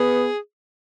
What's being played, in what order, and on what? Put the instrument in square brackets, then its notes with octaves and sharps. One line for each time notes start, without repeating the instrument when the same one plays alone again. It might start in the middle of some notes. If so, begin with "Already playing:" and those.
Already playing: [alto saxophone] B3 [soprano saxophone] G#4